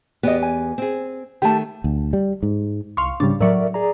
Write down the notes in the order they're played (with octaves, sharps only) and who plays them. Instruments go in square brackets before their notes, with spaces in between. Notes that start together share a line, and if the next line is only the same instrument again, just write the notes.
[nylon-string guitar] E2 B3 G4 [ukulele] F#4 D#5
[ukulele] G#5
[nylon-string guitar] C4 G#4
[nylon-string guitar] D#3 A3 [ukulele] G4 A5
[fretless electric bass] D2
G3
G#2
[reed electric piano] C2 [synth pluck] F5 C6 C#6
[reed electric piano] G#2 C#3 G3 [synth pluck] D4
[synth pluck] A2 F#3 [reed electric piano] A#4 D5 E5
[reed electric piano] G#4 D5 A#5